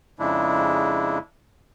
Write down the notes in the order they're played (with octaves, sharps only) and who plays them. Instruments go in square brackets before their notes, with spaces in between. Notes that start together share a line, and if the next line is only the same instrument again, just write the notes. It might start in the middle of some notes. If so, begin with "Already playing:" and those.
[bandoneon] F2 C#3 G#3 D4 E4